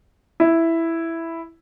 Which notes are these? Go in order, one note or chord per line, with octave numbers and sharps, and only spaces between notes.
E4